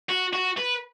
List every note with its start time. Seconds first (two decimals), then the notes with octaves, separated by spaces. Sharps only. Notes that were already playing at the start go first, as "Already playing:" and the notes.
0.09 F#4
0.33 F#4
0.57 B4